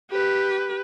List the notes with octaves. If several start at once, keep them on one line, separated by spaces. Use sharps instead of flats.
G4 B4